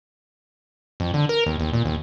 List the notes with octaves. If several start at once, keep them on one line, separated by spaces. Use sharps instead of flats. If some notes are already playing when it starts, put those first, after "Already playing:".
F2
D3
A#4
D#2
D#2
A#2
D#2